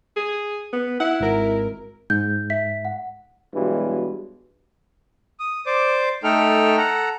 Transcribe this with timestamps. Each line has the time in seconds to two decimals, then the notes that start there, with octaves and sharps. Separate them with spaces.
0.16 G#4
0.73 B3
1.00 E4 F#5
1.20 G#1 A#4
2.10 G#2 G6
2.50 E5 B6
2.85 F#5
3.54 G2 B2 E3 F#3 G#3
5.40 D#6
5.66 C5 D5 D6
6.24 A3 D#4 A4 G5 F6
6.77 A4 F#5 A#5